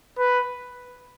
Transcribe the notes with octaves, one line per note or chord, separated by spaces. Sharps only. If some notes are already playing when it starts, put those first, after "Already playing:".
B4